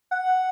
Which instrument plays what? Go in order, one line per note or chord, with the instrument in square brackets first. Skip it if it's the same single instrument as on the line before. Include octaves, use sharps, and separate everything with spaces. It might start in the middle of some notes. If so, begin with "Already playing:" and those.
[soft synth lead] F#5